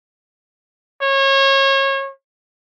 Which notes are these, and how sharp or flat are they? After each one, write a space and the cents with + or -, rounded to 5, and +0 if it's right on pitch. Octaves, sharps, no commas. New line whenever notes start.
C#5 -30